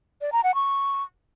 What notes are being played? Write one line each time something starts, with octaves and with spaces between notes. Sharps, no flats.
D5
A#5
F#5
C#6